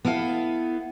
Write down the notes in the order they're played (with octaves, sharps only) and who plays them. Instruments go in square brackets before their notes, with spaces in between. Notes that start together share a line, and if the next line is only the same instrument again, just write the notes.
[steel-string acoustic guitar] B3 E4 A4 F5